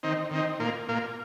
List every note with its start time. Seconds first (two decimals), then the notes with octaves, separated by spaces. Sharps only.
0.03 D#3 C4 D#4
0.31 D#3 C4 D#4
0.59 A#2 A#3 F4
0.88 A#2 A#3 F4